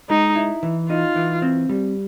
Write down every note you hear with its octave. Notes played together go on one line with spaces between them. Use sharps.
G#3 D#4
E4
E3
D#4 F4
E3
C4
G3